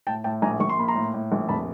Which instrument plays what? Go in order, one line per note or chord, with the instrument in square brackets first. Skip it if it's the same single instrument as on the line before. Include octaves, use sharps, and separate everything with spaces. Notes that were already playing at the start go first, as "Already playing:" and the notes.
[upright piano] A2 G5 A5
A2 G5 A5
A#1 G#5 A#5
A#1 C#6
C6
A#3 B5
A#5 C6
A2
A2
A#1
F1 A5 B5